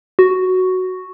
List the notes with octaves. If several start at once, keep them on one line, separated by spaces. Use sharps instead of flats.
F#4